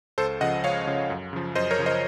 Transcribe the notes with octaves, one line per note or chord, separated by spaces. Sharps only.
C#2 A4 C5
C#3 F3 D#5 F#5
C#2 C#5 F5
C#3 F3
F#2
C#3 F3
F#2 C5 D#5
A#4 C#5
C#3 F3
C5 D#5